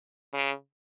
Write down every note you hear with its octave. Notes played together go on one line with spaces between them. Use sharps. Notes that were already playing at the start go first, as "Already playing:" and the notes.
C#3